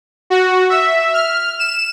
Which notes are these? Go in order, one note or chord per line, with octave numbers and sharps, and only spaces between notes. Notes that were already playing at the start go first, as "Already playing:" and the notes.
F#4
E5
F6
E7